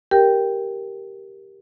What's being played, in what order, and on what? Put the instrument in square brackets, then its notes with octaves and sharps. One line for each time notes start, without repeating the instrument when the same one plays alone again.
[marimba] G4 A#4 G5